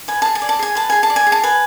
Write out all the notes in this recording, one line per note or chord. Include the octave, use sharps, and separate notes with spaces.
B4 G#5
G#4 A5
G#5
D5
A5
G#4 G#5
B4 A5
G#4 G#5
A5
D5
G#5
G#4
A5
B4 G#5